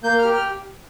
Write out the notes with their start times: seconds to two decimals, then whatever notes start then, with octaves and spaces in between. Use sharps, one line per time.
0.04 A#3 G6
0.19 F6
0.24 G4
0.34 F6